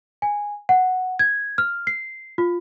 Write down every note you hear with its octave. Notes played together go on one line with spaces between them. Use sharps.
G#5
F#5
G#6
F6
C7
F4